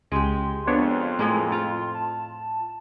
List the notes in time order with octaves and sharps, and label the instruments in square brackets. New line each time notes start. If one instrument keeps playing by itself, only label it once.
[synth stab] C#2 [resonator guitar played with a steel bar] G#3 G4 [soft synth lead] C6
[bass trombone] F2 [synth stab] B3 D4 C#5
[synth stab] A2 [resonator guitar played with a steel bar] F3 G#3 A#3
[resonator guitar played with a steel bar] F4
[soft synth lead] A5